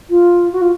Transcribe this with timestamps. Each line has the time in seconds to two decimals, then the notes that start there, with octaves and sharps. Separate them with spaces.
0.09 F4
0.52 F#4
0.61 F4